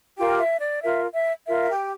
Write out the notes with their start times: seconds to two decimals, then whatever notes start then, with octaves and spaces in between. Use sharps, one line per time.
0.17 F4 G4 A#4 G5
0.39 E5
0.60 D5
0.82 F4 A#4 E5
1.15 E5
1.47 F4 A#4 E5
1.61 F5
1.69 G4 G5